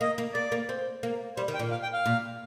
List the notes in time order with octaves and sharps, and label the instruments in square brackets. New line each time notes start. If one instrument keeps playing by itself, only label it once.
[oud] A#3 [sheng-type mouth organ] D#5
[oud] A#3
[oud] A#3 [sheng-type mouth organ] D5
[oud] A#3
C4
A#3
[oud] G3 [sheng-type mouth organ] C5
[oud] D#3
[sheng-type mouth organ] G5
[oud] A#2
[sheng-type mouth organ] F5
G5
F5
[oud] A#2